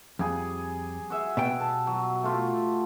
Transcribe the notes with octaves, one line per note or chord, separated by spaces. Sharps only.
F2 G3 G#4
F#4 G#4 E5
B2 G5
A5
F#3
A3 F4 G4